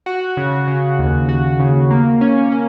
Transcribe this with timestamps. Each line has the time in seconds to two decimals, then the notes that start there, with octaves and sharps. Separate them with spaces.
0.06 F#4
0.37 C#3
0.68 C#3
0.99 D#2
1.29 F#4
1.60 C#3
1.91 A#3
2.21 C#4
2.52 C#4